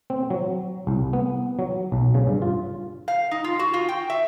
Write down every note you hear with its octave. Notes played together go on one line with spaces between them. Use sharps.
C4
F#3
C2
B3
F#3
B1
C#3
G2
F4
F5
D#4
F4
F#4
F4
G5
E5